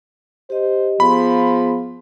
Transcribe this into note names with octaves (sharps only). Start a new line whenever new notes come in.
G4 C5 D#5
F3 B3 G#4 B5 C6